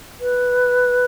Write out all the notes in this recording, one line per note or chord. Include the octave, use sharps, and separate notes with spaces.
B4